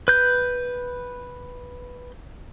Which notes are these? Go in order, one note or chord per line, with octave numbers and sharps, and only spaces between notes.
B4 G6